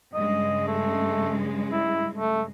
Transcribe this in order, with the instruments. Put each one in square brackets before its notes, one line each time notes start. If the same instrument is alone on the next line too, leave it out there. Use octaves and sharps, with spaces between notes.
[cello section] G2 C#3 G#3 [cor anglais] D#5
[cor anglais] A3
E4
A3